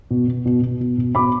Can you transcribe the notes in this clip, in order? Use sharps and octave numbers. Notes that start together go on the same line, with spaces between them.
B2
B2
B2
B2
B2
B2
B2 B5 D6